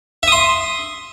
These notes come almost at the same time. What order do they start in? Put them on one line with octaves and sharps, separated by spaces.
E5 D#6 C6